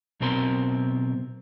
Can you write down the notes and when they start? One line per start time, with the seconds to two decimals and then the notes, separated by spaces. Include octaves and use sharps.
0.20 B1 B2 C4 A#4 C6